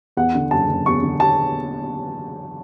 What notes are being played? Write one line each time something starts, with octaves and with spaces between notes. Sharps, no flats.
E2 F#5
D3
F#1 A5
F#1
E2 C#6
D3
A5